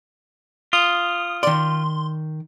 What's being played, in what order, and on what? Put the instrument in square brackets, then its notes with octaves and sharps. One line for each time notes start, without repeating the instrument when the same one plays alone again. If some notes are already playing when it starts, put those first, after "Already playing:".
[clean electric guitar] F4 [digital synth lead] D#6
[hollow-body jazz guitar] D#3 D5 [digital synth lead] C6